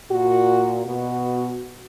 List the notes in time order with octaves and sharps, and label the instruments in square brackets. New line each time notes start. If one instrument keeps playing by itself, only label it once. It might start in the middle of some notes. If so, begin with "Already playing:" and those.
[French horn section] A#2 F#4
B2 F#4